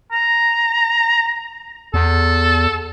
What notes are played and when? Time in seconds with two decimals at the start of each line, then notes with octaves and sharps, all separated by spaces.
0.13 A#5
1.94 E2 A4